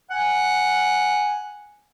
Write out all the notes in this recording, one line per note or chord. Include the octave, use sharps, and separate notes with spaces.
F#5 G#5